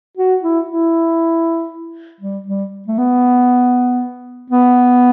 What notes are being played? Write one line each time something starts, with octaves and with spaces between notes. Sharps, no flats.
F#4
E4
E4
G3
G3
A3
B3
B3